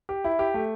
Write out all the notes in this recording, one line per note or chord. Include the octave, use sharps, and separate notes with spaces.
G4
E4
G4
A3